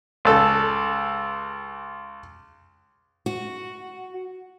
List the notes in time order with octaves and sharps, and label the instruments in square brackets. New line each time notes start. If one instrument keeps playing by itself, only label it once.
[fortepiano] C#2 A4
[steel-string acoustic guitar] F#4